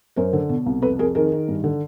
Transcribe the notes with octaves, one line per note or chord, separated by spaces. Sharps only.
F#2 A#4 C5
D3
B2
C2
F2 A4 B4
F2 G#4 A#4
D#3 G#4 A#4
D#3
G2
D3